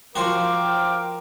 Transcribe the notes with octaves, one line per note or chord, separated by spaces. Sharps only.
F3 F4 F#4 A#4 C5 F5 G5 D6